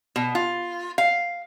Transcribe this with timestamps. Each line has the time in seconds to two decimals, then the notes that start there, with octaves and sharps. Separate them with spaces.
0.16 B2
0.35 F4
0.98 F5